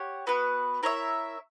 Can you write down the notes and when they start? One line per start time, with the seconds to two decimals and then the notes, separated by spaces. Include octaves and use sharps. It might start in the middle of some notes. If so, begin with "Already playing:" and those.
Already playing: G4 C#5 F#5
0.27 B3 F#4 B4
0.83 E4 A#4 C#5 E5